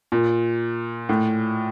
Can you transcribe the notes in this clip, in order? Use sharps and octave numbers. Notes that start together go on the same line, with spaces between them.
A#2
A2